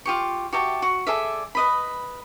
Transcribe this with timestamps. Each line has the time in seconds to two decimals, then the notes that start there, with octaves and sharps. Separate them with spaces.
0.06 F4 G4 C#6
0.53 F#4 G4 E5 A5
0.82 F#4
1.07 G#4 A4 D5 E5
1.55 B4 D#5 B5